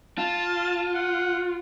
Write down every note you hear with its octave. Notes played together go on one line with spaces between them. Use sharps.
F4 A5
F#5